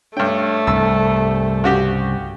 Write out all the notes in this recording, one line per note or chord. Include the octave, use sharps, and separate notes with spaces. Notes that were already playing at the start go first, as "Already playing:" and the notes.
G2 A3 D4 C#5 G5
C2 G2 G5 E6
C#3 F#4 G4